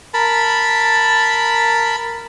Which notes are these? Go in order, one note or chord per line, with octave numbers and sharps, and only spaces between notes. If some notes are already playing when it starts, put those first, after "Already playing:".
A#4 A5 B5